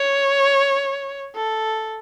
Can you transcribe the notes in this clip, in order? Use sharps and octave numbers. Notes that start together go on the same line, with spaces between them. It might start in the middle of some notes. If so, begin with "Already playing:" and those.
Already playing: C#5
A4